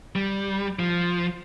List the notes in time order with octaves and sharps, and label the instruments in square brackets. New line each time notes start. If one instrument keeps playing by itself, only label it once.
[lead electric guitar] G3
F3